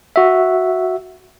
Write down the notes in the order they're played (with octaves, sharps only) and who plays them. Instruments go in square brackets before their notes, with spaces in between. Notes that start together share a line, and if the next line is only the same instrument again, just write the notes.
[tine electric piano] F#4 E5